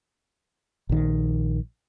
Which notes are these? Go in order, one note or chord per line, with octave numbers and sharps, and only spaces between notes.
A#1 D#3